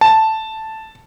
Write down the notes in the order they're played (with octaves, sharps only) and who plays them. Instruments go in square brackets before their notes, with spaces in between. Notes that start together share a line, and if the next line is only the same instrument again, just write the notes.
[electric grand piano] A5